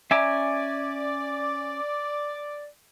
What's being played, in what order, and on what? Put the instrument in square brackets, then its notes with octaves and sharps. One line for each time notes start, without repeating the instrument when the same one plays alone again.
[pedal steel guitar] C#4 G#5 D6 [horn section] D5 [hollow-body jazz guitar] E5 A#5